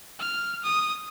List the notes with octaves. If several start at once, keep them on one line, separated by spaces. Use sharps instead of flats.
F6
D#6